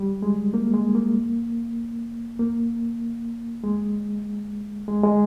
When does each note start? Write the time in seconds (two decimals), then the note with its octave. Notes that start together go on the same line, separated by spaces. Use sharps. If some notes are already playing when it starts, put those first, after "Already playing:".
Already playing: G3
0.22 G#3
0.54 A#3
0.74 G#3
0.95 A#3
2.39 A#3
3.64 G#3
4.88 G#3
5.04 G#3